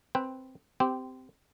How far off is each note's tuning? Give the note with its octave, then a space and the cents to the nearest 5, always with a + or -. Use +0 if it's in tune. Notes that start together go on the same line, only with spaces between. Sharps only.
C4 +0 B4 +0 G5 +15
C4 -20 G4 +0